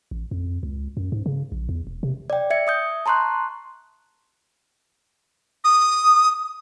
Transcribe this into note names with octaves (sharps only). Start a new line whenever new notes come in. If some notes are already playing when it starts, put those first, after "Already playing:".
A1
F2
C#2
F#2
G#2
C#3
A#1
E2
E1
C3
D5 G5
E5 G#6 C#7
E5 D#6 G6
A5 A#5 C6 C#6 F#6
D#6